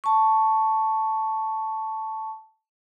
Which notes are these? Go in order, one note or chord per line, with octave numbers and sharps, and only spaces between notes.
A5 C#6